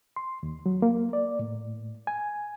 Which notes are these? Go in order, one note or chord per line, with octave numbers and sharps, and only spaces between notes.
C6
D#2
F#3
A#3
D5
A2
G#5